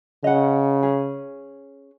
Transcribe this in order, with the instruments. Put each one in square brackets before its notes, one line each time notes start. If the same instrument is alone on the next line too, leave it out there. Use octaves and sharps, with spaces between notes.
[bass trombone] C#3 [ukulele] D#5 F#5
[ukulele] C#4 G#4